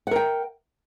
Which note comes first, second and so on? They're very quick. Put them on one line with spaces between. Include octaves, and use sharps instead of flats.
F#5 A#4 G5